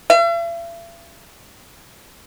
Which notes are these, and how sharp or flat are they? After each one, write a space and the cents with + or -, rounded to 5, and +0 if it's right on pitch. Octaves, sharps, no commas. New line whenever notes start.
E5 +45